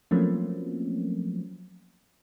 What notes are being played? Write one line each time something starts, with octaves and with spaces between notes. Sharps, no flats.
F3 F#3 A3 A#3 C4 C#4